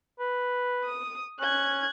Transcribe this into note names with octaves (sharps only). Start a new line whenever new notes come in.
B4
D#6
C#4 F#6 G#6